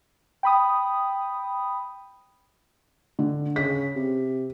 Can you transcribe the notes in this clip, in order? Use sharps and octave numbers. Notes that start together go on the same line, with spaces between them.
G5 B5 D#6
D3
C#3 B6
C3